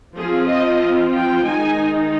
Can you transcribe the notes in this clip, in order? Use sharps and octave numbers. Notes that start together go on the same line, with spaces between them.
F3 C4 F4 G#4
D#5
G5
D#3 G#3 D#4 G#5